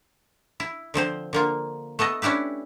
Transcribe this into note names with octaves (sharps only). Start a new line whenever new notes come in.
E4
D3 F3 C4 C5
D3 A#3 F4
A3 B3 A4 D#5
C#4 D4 E4 G4 B4